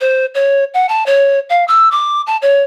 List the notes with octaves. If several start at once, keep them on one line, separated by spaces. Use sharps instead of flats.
C5
C#5
F#5
A5
C#5
F5
E6
D6
A5
C#5